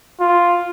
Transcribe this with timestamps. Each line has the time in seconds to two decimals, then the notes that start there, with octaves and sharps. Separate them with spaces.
0.20 F4